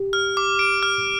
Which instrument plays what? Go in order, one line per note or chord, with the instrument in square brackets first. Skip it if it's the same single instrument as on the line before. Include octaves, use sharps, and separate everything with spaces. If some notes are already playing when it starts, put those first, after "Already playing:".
Already playing: [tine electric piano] G4
[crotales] F6
D6
D7
F6